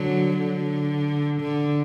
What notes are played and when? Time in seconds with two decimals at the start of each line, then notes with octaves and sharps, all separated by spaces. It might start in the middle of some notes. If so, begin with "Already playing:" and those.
Already playing: D3 F#3
0.37 D3
1.41 D3